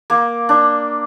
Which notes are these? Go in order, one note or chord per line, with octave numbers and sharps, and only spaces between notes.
A#3
D4